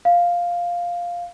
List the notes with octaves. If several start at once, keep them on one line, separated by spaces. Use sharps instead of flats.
F5